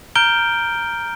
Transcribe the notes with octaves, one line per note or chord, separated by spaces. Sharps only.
A#5 F6 G6 D7 G7